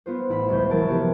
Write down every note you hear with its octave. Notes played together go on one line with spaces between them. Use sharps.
B3 F4 C5
A1 E4 B5
F#1 C#2 C#3 G6
E3 F#3 A#4 A5 D7
C3 F3 B3 F4 G4